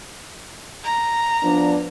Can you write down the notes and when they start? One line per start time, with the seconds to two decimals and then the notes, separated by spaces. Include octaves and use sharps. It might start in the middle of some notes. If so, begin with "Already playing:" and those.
0.84 A#5
1.44 F3 B3 D4